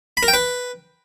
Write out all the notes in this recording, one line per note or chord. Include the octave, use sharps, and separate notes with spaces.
B5
A#4
G5
B4